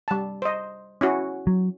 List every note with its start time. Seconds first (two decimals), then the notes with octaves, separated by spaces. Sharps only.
0.08 G3 A5
0.42 C5 D#5
1.01 C#4 E4 F#4
1.47 F#3